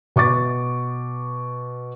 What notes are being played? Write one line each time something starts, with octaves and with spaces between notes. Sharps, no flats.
B2 C#6 D6 A6